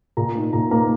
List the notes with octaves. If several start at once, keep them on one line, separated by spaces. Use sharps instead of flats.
A#2 A#5
A#3 D#4
A#2 A#5
A#3 D#4 A#5